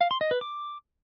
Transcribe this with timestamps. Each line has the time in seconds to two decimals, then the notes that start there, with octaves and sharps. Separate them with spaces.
0.01 F5
0.11 C6
0.21 D#5
0.31 B4
0.41 D6